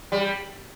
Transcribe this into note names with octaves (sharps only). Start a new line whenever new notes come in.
G3